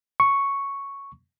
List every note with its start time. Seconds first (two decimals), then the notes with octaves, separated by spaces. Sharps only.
0.20 C#6